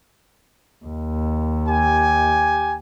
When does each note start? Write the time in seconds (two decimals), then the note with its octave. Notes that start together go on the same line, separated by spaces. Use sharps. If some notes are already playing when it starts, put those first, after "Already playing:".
0.86 D#2
1.68 G4 G#5